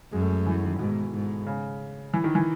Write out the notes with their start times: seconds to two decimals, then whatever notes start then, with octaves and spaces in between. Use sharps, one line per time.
0.12 F#2 G#3
0.22 A3
0.29 G#3
0.46 E3
0.63 D#3
0.79 G#2 B2
1.13 G#2
1.46 C#3
2.14 E3
2.24 D#3
2.35 E3